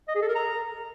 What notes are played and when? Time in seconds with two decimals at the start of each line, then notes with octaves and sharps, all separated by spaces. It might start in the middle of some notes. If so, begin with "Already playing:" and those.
0.08 D#5
0.15 G#4
0.22 A4
0.29 A#4
0.35 A#5